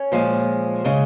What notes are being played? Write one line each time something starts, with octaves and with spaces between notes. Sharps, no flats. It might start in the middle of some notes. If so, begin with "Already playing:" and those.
Already playing: C#4
A#2 F3 G#3
C#3 G#3